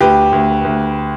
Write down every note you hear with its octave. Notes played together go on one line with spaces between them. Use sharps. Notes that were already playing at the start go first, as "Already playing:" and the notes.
D2 G4 B4
D2
D2